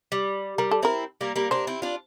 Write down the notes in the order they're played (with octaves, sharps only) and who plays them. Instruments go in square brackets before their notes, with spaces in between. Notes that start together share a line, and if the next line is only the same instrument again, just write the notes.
[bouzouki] G3
[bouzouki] G3 [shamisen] A#4
[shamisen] A4
[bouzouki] C4 E4 [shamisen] A#4
[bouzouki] G3 A#3
G3 A#3
[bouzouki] A#3 D4 [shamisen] C5
[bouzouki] C4 E4
D4 F4